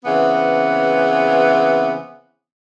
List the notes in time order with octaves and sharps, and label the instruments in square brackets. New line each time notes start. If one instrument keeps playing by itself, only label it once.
[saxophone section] C#3 E3 B3 C4